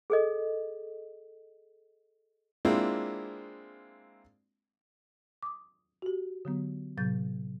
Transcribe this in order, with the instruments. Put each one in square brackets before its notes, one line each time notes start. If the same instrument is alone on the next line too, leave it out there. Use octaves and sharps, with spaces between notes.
[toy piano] G#4 A4 D#5
[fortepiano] G#3 A#3 C4 D4 E4 F4
[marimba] D6 D#6
F#4 G4
D3 F#3 B3
A2 C3 F#3 G6 A6